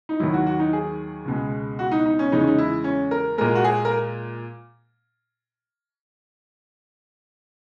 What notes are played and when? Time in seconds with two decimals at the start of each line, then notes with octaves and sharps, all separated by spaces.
0.09 D#4
0.20 D#2 D#3 F#3 E4
0.34 F#4
0.47 F#4
0.59 D#4
0.73 G#4
1.25 C#2 B2 G#3
1.79 F#4
1.92 D#4
2.06 D#4
2.19 C#4
2.32 E2 C#3 G#3 D#4
2.40 C#4
2.47 D#4
2.58 E4
2.84 C#4
3.11 A#4
3.38 A#2 G#3 A#4
3.55 F#4
3.64 G#4
3.85 A#4